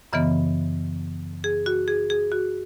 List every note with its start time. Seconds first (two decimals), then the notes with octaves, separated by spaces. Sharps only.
0.13 F#2 C#3 E3 B3 D#5
1.44 G#4
1.66 F#4
1.88 G#4
2.10 G#4
2.32 F#4